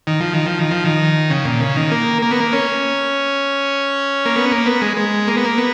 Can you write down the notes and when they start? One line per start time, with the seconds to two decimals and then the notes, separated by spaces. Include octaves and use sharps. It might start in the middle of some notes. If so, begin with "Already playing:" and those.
0.07 D#3
0.20 F3
0.33 D#3
0.46 F3
0.59 D#3
0.71 F3
0.85 D#3
1.30 C#3
1.45 A#2
1.60 C#3
1.76 D#3
1.91 A#3
2.22 A#3
2.31 B3
2.40 A#3
2.53 C#4
4.26 A#3
4.36 B3
4.52 A#3
4.66 B3
4.82 G#3
4.97 G#3
5.27 A#3
5.37 B3
5.45 A#3
5.58 B3